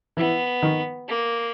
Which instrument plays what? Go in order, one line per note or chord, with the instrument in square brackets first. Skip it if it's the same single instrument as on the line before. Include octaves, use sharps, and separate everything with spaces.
[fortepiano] E3 [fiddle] B3
[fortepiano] D#3
[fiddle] A#3